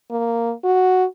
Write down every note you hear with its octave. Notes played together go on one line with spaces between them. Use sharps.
A#3
F#4